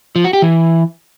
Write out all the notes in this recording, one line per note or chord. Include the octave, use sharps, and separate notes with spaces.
F3
F#4
G4
E3